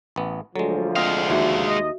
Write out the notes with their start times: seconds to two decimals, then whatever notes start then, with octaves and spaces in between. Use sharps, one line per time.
0.16 A1 B3
0.56 D2 F3 F#3 G#3 A4
0.96 G#3 C4 D#5 F5
1.30 D#2 F#4 E5
1.67 D#5